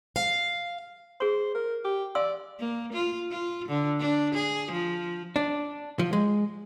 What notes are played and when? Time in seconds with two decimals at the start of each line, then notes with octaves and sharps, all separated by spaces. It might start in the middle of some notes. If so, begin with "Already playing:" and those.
0.16 F5
1.20 G#4 C5 C6
1.54 A#4
1.85 G4
2.15 D5 F5 C6 E6
2.59 A#3
2.93 F4
3.31 F4
3.68 D3
3.99 D4
4.35 G#4
4.71 F3
5.36 D4
5.99 F3
6.13 G#3